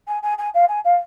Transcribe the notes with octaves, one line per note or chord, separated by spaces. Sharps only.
G#5
G#5
G#5
F5
G#5
F5